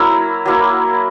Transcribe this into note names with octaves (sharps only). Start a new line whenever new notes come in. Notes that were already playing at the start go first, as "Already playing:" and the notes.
Already playing: F#3 A#3 E4
F#3 A#3 E4